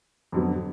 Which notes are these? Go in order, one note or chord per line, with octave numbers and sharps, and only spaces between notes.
F2 D3 F#3 B3